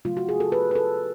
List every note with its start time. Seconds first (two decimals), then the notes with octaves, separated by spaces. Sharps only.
0.05 C#3 F#3 A3 F4
0.17 F#4
0.29 G#4
0.40 A4
0.52 B4
0.71 B4
0.75 A4